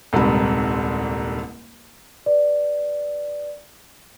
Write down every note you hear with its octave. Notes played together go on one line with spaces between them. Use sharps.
D#1 C2 G#2 C3 B5
B4 D5